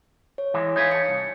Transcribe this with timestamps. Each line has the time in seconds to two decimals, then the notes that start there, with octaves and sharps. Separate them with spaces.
0.38 C#5
0.54 E3 G#3
0.76 D#4 G#4 B4 C#5 F5
0.92 A5 A6 C#7
1.08 C2